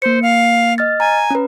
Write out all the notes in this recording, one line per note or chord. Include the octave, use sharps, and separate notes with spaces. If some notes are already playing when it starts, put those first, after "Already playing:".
A#3 C5 C#7
F5
D#5 F6 A6
G#5 A#5
C#4 B4